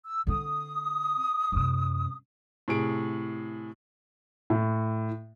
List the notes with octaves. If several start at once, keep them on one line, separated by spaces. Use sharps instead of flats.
E6
D3 C4 D#6
F#2 C3
A2 C3 G#4 D7
A2